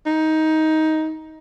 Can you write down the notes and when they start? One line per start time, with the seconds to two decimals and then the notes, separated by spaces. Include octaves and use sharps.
0.06 D#4